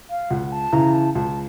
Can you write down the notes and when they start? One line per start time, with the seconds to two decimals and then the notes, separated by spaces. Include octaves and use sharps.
0.10 F5
0.30 C#2 F#5
0.52 A5
0.73 C#3 E3 A#5
0.93 A5
1.14 C#2 A5